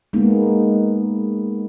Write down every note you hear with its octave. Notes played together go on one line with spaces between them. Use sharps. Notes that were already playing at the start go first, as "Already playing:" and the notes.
G#3 A#3 B3 D#4